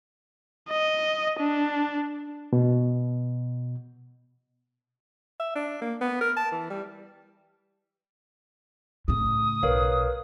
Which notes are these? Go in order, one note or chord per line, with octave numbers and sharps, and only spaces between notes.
D#5
D4
B2
E5
D4
A#3
B3
A#4
A5
E3
G3
A2 C#3 D#6
B1 A#4 B4 C#5 F5